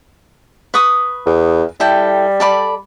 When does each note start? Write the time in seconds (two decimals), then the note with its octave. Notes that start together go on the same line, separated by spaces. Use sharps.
0.74 B4 C#6 D#6
1.26 E2
1.80 G3 E4 A4 G5
2.40 A4 D5 B5